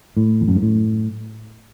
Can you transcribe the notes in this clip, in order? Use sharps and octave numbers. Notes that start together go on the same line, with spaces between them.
A2
E2
F#2
G#2
A2